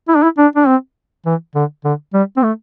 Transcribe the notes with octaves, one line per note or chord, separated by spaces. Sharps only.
E4
D4
E4
D4
D4
C4
E3
D3
D3
G3
C4
A3